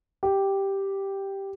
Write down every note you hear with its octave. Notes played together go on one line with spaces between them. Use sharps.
G4